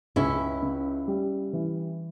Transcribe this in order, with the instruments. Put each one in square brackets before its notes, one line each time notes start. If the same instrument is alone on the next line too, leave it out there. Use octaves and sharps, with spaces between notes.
[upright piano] C#2 [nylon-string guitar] C#4 E4
[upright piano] C#3
G3
E3